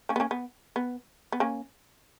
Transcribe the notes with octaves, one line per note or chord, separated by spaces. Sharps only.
A#3 C#4
B3
A#3 C#4
B3
B3
B3
A#3 C#4